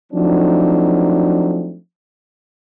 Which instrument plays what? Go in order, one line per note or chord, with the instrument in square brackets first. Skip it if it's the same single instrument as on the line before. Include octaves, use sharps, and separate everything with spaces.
[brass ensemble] F3 F#3 A3 C4 D4 D#4